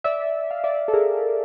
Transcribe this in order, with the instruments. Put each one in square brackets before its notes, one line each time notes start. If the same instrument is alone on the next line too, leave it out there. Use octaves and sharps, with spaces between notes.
[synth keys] D5 E5
F5
D5 E5
A4
G#4 A#4